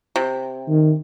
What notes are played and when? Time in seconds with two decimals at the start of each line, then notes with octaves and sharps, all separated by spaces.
0.16 C3
0.69 D#3